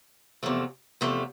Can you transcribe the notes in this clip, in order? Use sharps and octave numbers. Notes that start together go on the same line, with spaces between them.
E2 C3 F3 A3
E2 C3 F3 A3